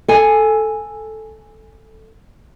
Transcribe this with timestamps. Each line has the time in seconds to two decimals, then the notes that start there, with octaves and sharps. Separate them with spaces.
0.08 A4 G#5